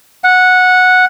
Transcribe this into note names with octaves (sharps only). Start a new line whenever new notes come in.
F#5